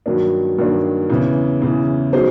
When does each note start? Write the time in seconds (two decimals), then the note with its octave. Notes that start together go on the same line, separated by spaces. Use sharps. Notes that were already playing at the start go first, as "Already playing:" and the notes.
0.06 G2 D#3 F#3 A#3 D4
0.58 G2 D#3 F#3 A#3 D4
1.10 E2 C#3 E3
1.62 E2 C#3 E3
2.13 F#3 B3 D#4 G#4 C5